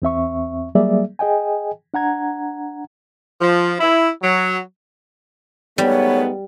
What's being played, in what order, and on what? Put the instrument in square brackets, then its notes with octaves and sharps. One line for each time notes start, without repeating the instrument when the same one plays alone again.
[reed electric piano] E2 C4 E5 C#6
F#3 G3 A#3 G#4 D5 E5
G#4 D#5 G5 G#5
D4 F#5 A#5 G#6
[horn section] F3
E4
F#3
[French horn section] G#2 A3 B3 [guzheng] G3 [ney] C#5